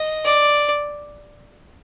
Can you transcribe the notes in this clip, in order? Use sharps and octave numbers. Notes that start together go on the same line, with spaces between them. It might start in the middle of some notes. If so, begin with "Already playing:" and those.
Already playing: D#5
D5